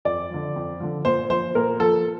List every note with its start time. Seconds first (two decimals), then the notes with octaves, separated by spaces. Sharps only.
0.05 F2 D5
0.30 D3 F3
0.56 F2
0.80 D3 F3
1.05 A#2 C5
1.30 F3 C5
1.55 A#2 A#4
1.80 F3 A4